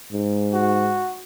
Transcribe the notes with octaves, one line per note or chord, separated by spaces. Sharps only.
G#2
F#4